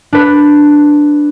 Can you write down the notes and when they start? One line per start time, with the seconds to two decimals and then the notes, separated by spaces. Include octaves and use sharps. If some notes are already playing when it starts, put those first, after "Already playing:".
0.13 D4 B4